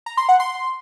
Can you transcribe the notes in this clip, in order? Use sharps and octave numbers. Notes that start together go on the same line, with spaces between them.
A#5
C6
F#5
C6